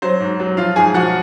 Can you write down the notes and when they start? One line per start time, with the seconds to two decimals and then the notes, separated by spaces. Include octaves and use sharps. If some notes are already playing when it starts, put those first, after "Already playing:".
0.02 F#3 C5
0.20 G#2
0.40 F#3
0.57 F3 F4 F5
0.76 G#2 G#4 G#5
0.94 F3 F#4 F#5